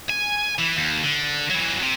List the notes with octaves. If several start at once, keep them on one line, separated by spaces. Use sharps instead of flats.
G#5
E3
D#2
D3
E3 F#3
C3